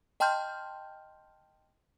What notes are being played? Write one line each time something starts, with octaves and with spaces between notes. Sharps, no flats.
D#5 G5 A5 C6 F6 G6